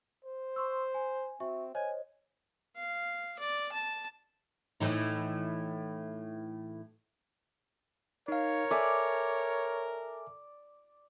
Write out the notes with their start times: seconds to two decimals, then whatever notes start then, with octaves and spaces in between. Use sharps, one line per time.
0.24 C5
0.56 C6 C#6 E6
0.94 G#5
1.40 C4 F#4 E5 C#6
1.75 C5 C#5 D#5 G#5
2.76 F5
3.39 D5
3.72 A5
4.80 A2 E3 D#4
8.28 D#4 A#4 C#5 F5
8.71 A4 D5 E5 G#5